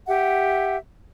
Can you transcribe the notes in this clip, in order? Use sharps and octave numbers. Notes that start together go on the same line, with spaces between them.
G4 E5 F#5